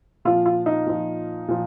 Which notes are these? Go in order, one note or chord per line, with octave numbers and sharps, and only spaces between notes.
A#2 F3 F4
F4
D#4
A#2 F3
A#2 F3